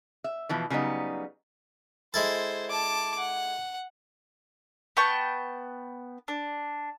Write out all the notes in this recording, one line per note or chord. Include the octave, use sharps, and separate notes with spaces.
E5
B2 E3 F3
C#3 F#3 G3 B3 D#4
G#3 E4 A4 C5
A5 D6
F#5
B3 G5 A5 C#6
D4